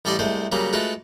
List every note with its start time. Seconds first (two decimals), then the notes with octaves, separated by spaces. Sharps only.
0.05 A1 G3 A4 D5 D#5 C6
0.19 C2 G#3 A3 C5
0.52 C#3 F#3 G3 A#3 G#4
0.73 G#3 A3 F4 F#4 B4